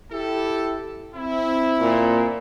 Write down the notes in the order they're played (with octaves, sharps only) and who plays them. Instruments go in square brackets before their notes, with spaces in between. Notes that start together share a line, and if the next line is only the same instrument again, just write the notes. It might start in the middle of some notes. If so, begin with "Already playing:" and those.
[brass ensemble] E4 G4 A4
C4 E4
[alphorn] A#2